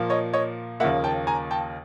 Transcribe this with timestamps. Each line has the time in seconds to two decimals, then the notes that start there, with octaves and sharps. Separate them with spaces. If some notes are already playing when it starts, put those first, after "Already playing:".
Already playing: A#2 F3 A#3
0.10 C#5 D#5
0.33 C#5 D#5
0.80 D#2 C#3 F3 A#3 E5 F#5
1.04 G5 A5
1.27 G#5 A#5
1.51 G5 A5